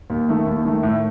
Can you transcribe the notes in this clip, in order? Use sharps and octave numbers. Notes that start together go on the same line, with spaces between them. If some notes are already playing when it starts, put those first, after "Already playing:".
D#2
D#3 A3
D#2
D#3 A3
A2